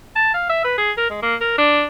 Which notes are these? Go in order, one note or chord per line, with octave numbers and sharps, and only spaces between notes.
A5
F5
E5
B4
G#4
A#4
G#3
A#3
A#4
D4